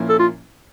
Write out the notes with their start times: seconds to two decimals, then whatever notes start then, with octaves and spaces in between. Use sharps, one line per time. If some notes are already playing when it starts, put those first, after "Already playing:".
Already playing: A#2 F3 A#3 C#4 E4
0.09 A4
0.19 F4